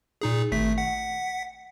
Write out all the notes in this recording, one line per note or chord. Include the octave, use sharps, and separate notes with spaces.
A#2 D#4 G#4
G#1 A3 B6
F#5 B6